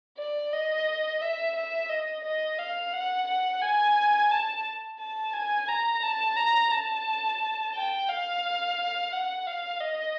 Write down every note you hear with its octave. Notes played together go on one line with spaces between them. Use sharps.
D5
D#5
E5
E5
D#5
D#5
F5
F#5
F#5
G#5
A5
A5
G#5
A#5
A5
A#5
A5
G5
F5
F#5
F5
D#5